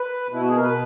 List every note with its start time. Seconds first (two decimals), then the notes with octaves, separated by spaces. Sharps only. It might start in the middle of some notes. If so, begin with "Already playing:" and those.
Already playing: B4
0.28 B2
0.34 E4
0.41 F#4
0.49 G#4
0.56 A#4
0.63 B2 B4